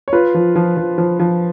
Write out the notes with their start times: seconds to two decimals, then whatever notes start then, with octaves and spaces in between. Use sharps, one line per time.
0.08 C#5
0.13 F4 B4
0.34 F3
0.56 F3
0.77 F3
0.98 F3
1.20 F3